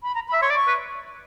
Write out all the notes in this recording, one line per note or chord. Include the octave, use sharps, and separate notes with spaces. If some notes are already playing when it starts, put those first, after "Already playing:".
B5
A#5
B5
E5
C#5 C6
D5
C#6
B4